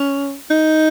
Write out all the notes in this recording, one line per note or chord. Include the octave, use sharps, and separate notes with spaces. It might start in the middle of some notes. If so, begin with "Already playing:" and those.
Already playing: C#4
D#4